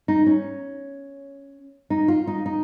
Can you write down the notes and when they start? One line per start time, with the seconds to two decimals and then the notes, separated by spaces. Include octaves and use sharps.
0.08 D#4
0.26 C#4
1.90 D#4
2.08 F4
2.27 D#4
2.46 D#4